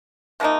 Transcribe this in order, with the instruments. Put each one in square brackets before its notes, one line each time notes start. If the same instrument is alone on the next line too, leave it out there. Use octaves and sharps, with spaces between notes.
[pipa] C3 F3 A#3 D#4